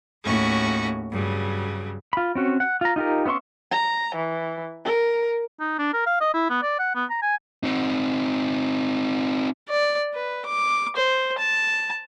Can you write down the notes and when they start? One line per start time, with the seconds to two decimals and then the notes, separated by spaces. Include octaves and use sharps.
0.24 D#2 A2 A3 C#4 F#4 C#6
1.11 G2 C#3 F#3
2.13 F4 B5
2.35 C4 C#4 F#4
2.60 F#5
2.81 F4 A#5
2.96 D#4 F4 G4 A#4
3.26 B3 C#4 E5 C6 C#6
3.72 A#5
4.15 E3
4.85 A#4
5.60 D#4
5.79 D4
5.93 A#4
6.06 F5
6.20 D#5
6.34 E4
6.49 B3
6.63 D5
6.79 F#5
6.95 B3
7.10 A#5
7.22 G#5
7.63 C4 D#4
9.69 D5
10.14 B4
10.45 D6
10.96 C5
11.38 A5